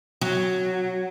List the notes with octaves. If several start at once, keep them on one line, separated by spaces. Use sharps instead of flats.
F#3